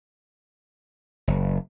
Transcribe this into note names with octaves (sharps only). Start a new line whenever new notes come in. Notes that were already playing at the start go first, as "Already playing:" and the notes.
F#1